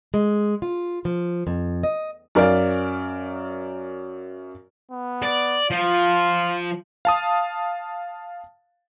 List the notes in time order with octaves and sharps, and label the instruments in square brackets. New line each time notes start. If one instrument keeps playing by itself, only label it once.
[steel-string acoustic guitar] G#3
F4
F3
F2
D#5
[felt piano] F#2 A#4 D5 F5
[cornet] B3
[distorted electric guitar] D5
[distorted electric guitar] F3 [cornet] F4
[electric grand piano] F5 A5 D#6